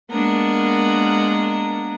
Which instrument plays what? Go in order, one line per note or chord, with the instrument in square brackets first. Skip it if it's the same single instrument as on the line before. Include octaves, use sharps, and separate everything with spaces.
[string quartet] G#3 A#3 B3 D4 A#4